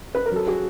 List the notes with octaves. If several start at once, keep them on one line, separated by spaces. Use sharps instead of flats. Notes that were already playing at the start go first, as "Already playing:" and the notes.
B4
A#4
F#3 A4
F#4 G#4